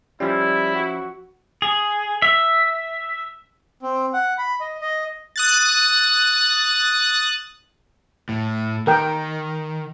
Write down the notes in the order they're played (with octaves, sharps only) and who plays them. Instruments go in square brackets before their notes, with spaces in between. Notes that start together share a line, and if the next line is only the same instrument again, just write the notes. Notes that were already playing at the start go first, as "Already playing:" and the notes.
[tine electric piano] F3 C#4 [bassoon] G3 [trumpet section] E4
[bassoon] F#4
[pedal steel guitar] G#4
E5
[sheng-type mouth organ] C4
F#5
B5
D#5
D#5
[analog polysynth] D#6 F#6 A6
[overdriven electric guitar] A2
[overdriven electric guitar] D#3 [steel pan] A#4 G5